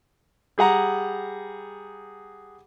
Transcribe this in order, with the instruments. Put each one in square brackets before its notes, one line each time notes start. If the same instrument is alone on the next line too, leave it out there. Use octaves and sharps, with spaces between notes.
[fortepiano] G3 G#4 F#5 A#5